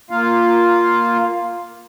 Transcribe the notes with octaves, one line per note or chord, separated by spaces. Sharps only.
A#3 F4 F5